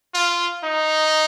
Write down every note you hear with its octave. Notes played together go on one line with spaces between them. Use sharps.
F4
D#4